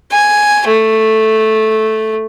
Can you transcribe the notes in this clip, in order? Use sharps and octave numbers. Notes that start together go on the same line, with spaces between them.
G#5
A3